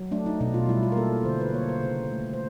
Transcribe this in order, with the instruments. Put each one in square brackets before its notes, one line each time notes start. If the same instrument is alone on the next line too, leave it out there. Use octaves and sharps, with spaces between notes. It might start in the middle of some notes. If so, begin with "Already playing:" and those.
Already playing: [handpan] F#3
A3 D4
D#4
B2 D4
F4
G3 E4
F4
A#4
A#3 A4
D3 C5
B4
A#3 C#5
C5
C#3
A3
C5